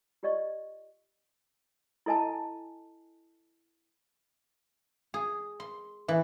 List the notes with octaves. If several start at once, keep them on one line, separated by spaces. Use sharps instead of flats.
F4 G4 D5 D#5 C#6
E4 A4 D#5 G#5 A5
G#4
C6
E3